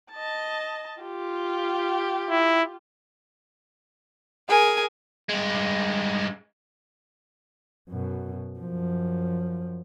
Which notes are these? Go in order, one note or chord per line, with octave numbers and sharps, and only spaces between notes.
D#5 A5
F4 G4
E4
G#4 A#4 G#5
G2 G#3
F#2 B2
F#2 F3